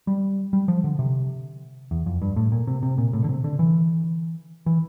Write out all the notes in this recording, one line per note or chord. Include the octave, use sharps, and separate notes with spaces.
G3
G3
F3
D3
C3
E2
F2
G2
A2
A#2
C3
C3
A#2
A2
D3
C3
D3
E3
E3